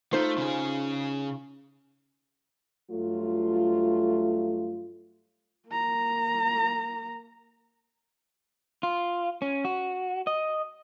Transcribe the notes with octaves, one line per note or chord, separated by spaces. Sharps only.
A3 D#4 F4 C5
C#3 G#4
G2 F#3 A3 F4
A#3 A#5
F4
C#4
F#4
D#5